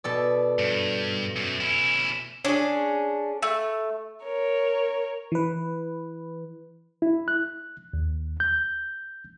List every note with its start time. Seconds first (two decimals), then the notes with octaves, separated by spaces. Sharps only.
0.04 B2 A4 D5
0.59 G2
1.36 F#2
1.60 C#4 E4
2.45 C#4 D4 G#4
3.43 A3
4.23 A#4 C#5
5.32 E3 B4
7.02 E4
7.28 F#6
7.94 D#2
8.40 G6